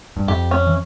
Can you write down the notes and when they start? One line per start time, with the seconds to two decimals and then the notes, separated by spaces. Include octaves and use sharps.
0.17 G2
0.28 F2 G4
0.51 C#4
0.67 E3